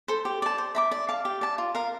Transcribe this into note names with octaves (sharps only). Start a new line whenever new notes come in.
A4 C5
G4
D5 A5
C5
E5 A#5 D6
D5
F5 A5 D6
G4
D5 A5
F4
A#4 F5